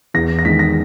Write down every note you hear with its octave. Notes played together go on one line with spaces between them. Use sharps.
E2 A#6
A#6
D#3 G#3 B6
A#6